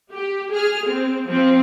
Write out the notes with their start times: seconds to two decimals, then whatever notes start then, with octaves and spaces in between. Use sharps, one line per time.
0.11 G4
0.51 G#4 F6
0.87 C4
1.27 F3 C4